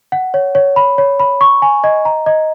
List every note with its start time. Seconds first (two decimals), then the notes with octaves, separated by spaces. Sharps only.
0.12 F#5
0.34 C#5
0.55 C#5
0.76 B5
0.98 C#5
1.20 B5
1.41 C#6
1.62 G#5
1.84 D#5
2.05 A#5
2.26 D#5